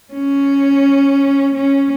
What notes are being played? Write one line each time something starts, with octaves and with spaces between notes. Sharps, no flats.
C#4
C#4